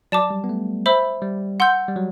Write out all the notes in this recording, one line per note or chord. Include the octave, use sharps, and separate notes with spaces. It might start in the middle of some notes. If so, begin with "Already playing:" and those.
F#3 D5 A5 D6
G3
B3
A3
C5 E5 B5 E6
G3
F#5 C6 E6 G6
G3
F#3